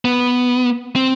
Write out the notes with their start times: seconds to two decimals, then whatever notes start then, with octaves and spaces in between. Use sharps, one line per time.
0.05 B3
0.96 C4